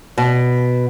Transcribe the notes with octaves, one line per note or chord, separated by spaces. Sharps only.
B2